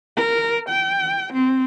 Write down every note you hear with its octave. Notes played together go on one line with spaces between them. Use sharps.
A#4
G5
C4